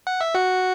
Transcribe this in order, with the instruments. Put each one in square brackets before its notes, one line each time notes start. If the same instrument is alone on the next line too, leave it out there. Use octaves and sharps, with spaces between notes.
[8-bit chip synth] F#5
E5
F#4 F#5